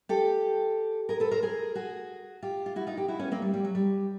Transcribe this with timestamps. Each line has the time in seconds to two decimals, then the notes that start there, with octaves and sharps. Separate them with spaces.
0.09 G4 A4
1.09 G#4 A#4
1.20 A4 B4
1.31 A#4 C5
1.42 G#4 A#4
1.75 F#4 G#4
2.42 F4 G4
2.66 F4
2.76 E4 F#4
2.87 D#4 F4
2.97 F4 G4
3.08 E4 F#4
3.19 B3 C#4
3.31 A#3 C4
3.42 G3
3.54 G3
3.64 F#3
3.75 G3